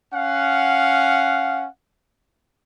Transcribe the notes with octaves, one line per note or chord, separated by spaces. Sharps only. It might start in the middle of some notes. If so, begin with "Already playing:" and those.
C#4 F5 F#5